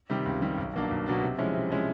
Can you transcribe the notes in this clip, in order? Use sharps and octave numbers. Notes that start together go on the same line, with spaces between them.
C3 D#3 G3
C#2
C3 D#3 G3
B1
B2 F#3 A#3 D4
B1
B2 F#3 A#3 D4
C3
F3 G#3 C#4 E4
C3
F3 G#3 C#4 E4